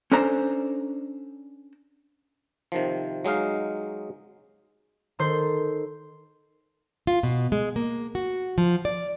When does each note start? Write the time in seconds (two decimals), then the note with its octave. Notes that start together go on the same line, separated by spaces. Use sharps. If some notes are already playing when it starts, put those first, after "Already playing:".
0.12 C#4 D4 A4 C5 A#5
2.72 C3 D#3 F3
3.24 F#3 G#3 D#4 F5
5.19 D#3 A4 C5
7.07 F4
7.23 B2
7.52 G#3
7.76 A#3
8.15 F#4
8.58 F3
8.85 D5